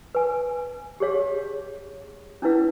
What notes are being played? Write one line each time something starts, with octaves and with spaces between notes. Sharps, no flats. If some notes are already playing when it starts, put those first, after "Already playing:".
B4 G#5
G4 G#4 C#5 F5
C#4 D4 E4 B4 F5